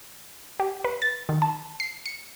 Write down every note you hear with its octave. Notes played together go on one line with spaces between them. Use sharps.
G4
B4
A6
D#3
A5
C7
C#7